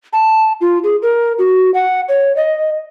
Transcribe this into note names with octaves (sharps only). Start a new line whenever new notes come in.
A5
F4
G#4
A#4
F#4
F#5
C#5
D#5